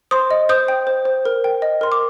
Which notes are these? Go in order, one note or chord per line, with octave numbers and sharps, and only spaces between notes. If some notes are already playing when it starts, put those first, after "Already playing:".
C5 C6 D#6
D#5
C5 D#6 G6
G5
C5
C5
A#4
G5
D#5
A#4 C6
D6